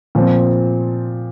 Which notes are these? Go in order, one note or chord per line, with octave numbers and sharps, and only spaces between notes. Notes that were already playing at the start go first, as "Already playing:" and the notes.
A#2 F3 C4